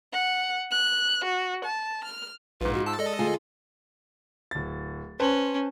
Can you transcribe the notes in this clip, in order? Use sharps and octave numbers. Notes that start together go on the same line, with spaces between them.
F#5
F#6
F#4
A5
F6
A#1 G#2 F4 B4
F#4
A5 E6
G#3 A4 D5 D#5
D2 F4 G#4 G#5
D1 A6
C#4 B4 C5 A5